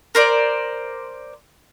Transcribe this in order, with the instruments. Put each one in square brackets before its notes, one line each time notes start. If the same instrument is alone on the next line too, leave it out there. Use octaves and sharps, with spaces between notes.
[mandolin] A#4 C5 D5